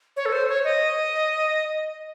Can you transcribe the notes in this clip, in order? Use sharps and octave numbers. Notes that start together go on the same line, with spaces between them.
C#5
A4
C5
C#5
D#5